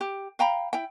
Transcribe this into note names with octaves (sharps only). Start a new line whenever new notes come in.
G4
F5 G5 A#5 B5
E4 G5